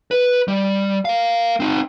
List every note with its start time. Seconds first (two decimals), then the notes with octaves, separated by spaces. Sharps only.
0.11 B4
0.48 G3
1.05 A#4 F5
1.60 C4 D#4